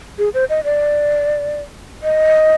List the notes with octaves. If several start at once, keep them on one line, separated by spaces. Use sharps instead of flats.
G#4
C5
D#5
D5
D#5